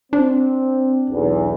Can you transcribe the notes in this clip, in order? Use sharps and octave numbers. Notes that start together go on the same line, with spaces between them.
C4 D4
B1 E2